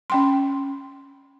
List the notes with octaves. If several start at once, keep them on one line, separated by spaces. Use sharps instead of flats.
C#4 G5 C6